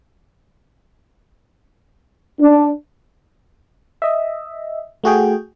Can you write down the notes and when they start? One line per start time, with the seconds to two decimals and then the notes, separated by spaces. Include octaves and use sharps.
2.41 D4
4.02 D#5 E5
5.04 A3 F#4 G#4 G5